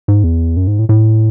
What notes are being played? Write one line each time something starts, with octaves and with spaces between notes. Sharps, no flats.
G#2
E2
F#2
G#2
A2
A2